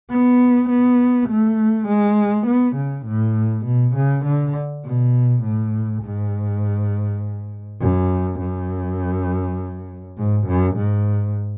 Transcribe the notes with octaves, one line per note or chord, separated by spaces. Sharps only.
B3
B3
A3
G#3
B3
C#3
A2
B2
C#3
D3
B2
A2
G#2
F#2
F#2
G#2
F#2
G#2